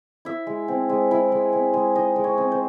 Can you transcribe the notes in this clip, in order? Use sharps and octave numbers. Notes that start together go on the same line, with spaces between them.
E4 E5
G#3
C4
G#3
E4
G#3
C4
G#3
D#4 D#5
G#3
C#5
C4
C5